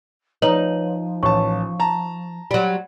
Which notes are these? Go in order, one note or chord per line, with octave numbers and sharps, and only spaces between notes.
F3 D#4 B4 C#5 F#7
A1 A5 C#6
A5 A#5
F#3 G3